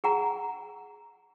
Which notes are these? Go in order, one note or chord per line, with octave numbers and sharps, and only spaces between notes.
G#4 F#5 A#5